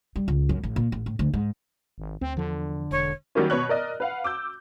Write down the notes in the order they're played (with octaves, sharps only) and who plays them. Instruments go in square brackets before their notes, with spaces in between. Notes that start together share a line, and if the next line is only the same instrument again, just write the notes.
[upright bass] G3
C#2
F#2
A1
A#2
A1
A2
D2
G#2
[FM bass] G#1
[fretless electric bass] D2 [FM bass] C4
[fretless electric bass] E2 F3 [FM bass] D3
[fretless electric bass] E1 [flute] C#5
[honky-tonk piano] D#3 F#3 G3 A#3 C#4
B2 B4 C#5 F#6
A#4 D5 D#5
B4 F5 F#5
D6 E6 G6